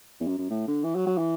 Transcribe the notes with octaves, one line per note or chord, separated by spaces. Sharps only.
E2
F#2
F#2
A2
D3
E3
F#3
F#3
E3